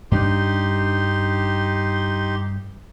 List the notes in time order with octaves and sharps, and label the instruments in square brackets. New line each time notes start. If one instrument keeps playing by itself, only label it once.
[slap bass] G2 D4 [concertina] D#4 G4 C6